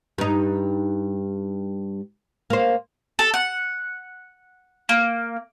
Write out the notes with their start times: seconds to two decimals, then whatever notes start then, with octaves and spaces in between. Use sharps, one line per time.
0.18 G2 D#4
2.50 A#3 C5
3.19 A4
3.34 F#5
4.89 A#3